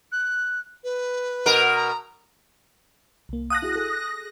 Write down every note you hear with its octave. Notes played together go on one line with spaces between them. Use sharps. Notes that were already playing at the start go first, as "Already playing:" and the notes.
F#6
B4
B2 A#4
A#5
C2 A#3
F5 F#5 A5 D#6 F#6 A#6
E4 F#4 G#4
G#4 A4